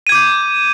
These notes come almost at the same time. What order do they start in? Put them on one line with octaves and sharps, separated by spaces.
D#7 G#6 D6 G6